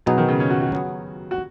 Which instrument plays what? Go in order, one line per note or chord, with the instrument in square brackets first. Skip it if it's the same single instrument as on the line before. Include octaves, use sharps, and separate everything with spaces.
[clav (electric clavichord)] B2 B3 D#4 G#4 [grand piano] F#3
[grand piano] D#3
C#3
C#4
F#4
F#4
[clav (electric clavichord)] F#3 B3 G#4
[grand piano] F#4